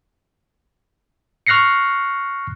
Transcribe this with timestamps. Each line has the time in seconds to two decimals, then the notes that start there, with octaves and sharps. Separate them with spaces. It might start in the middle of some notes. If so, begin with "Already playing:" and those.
1.47 C#6 F6 F#6 A#6 C7 C#7